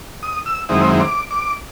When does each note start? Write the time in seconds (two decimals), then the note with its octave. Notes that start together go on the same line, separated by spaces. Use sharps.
0.23 D#6
0.46 E6
0.69 F#2 D#3 G#3 C4 E4 D#6
1.00 D6
1.31 D6